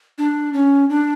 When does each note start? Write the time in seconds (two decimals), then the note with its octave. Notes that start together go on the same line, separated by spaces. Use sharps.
0.18 D4
0.53 C#4
0.90 D4